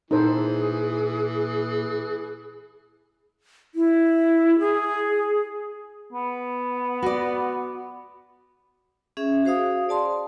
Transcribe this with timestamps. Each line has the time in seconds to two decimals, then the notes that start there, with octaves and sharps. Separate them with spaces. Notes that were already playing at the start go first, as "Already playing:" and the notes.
0.11 A#2 E3 D#4 G#4 A4 C5
3.75 E4
4.59 G#4
6.13 B3
7.02 F#4 D5
9.17 C#4 G#4 E5
9.44 F#4 G#4 C5 F5 D#6
9.89 D5 A5 C6